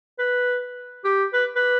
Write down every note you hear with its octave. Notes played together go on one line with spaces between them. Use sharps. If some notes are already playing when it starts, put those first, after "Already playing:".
B4
G4
B4
B4